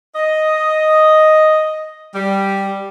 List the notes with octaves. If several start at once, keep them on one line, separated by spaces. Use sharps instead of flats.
D#5
G3